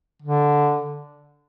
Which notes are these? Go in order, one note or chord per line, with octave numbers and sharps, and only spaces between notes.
D3